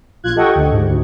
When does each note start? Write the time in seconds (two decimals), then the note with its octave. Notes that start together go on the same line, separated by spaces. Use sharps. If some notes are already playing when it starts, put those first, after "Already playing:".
0.24 A#1 F4 F#6 G#6
0.35 G4 A4 D#5 F#5 G5 C#6
0.55 D2
0.72 G#2
0.88 D2